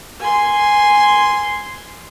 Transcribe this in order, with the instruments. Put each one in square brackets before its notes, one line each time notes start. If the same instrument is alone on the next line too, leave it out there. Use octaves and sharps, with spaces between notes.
[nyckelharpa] G#5 C6